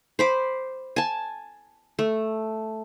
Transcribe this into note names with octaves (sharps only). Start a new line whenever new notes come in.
C5 B5 D6
G#5 A5
A3